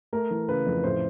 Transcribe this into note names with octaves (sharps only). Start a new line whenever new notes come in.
A3 A#4
E3
C#3 B4
F2
A2 C5